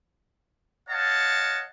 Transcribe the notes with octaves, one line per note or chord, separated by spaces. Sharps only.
C#5 D#5 F5 F#5 A5